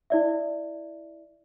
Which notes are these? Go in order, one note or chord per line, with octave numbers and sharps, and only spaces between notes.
E4 D5 E5